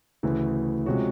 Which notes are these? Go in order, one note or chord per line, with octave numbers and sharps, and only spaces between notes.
D2 C#3 E3 A3
C3 F3 G#3 C#4 F#4